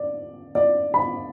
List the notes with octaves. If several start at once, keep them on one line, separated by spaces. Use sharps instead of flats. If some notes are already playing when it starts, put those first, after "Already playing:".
Already playing: D5
D5
B5